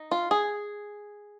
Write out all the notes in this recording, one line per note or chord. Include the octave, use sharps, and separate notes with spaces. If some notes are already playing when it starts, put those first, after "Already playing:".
Already playing: D#4
F4
G#4